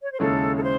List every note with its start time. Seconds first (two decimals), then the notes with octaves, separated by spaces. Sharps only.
0.02 C#5
0.11 C5
0.20 D#2 C#3 G#3 C#4 E4 A4
0.56 A4
0.63 C5